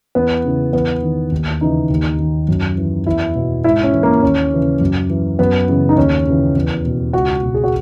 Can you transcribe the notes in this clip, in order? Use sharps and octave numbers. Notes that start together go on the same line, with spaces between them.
E2 B3
C#3 E3
E2 B3
D#3
D#2
C#3 E3 D#4
D#2
D#3
F#2
E3
E2 E4
B2
G#2 E4
C#4
E3
A#3
D#2 C#4
C#3 E3
F#2
E3
F#2 B3
C#3 E3
D#4
D#2 C#4
C#3 E3
E2
B2
C#2 F#4
B2
G#4
F#4